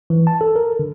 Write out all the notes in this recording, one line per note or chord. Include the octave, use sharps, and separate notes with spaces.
E3
A5
A4
A#4
D3